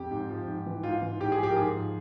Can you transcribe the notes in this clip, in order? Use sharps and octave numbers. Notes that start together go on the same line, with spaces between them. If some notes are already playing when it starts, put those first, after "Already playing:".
Already playing: F2 G4
G#2
F3
G#2
E3
G#2 F4
E3
G#2 G4
G#4
F3 G4
A#4
G#2 G#4
F3